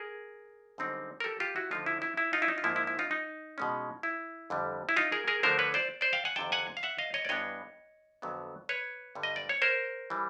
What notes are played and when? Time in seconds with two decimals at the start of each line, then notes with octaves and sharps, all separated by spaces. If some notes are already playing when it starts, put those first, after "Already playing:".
Already playing: G#4 A#4
0.78 F#2 D3 G3 C4 D#4
1.20 A#4
1.24 G4 A4
1.40 F4 G4
1.56 E4 F#4
1.71 D3 F3 A3 D#4 F4
1.86 E4
2.02 E4
2.17 E4
2.33 D#4 F4
2.42 E4
2.48 D#4
2.58 F4
2.64 G#2 F3 A#3 E4
2.76 E4
2.87 E4
2.99 D#4 F4
3.11 D#4
3.58 B2 G#3 C#4
4.03 E4
4.50 F2 D3 G3
4.89 E4
4.96 D#4 F4
5.12 G#4 A#4
5.28 G#4 A#4
5.43 D3 F3 A3 D4 A#4 C5
5.59 B4 C#5
5.74 C5 D5
6.01 C5 D5
6.13 F5 G5
6.25 F#5 G#5
6.36 F2 C3 D#3 G5 A5
6.52 F#5 G#5
6.77 F5
6.83 E5 F#5
6.98 D#5 F5
7.14 C#5 D#5
7.25 D5
7.29 G2 E3 G3 B3 D4 C#5 D#5
8.22 F2 D3 F#3 B3
8.69 B4 C#5
9.15 G2 D3 G3
9.23 D#5
9.36 D5
9.49 C#5
9.62 A#4 C5
10.10 E3 G3